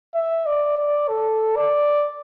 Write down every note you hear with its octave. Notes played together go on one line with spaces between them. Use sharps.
E5
D5
D5
A4
D5